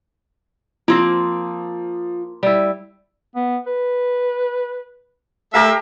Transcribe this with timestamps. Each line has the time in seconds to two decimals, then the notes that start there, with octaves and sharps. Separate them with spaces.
0.88 F3 A#3 C4
2.43 G3 E4
3.35 B3
3.66 B4
5.54 A3 G4 A4 A#4 E5 F5